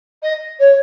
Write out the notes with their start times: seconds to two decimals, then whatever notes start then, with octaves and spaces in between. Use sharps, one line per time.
0.23 D#5
0.60 C#5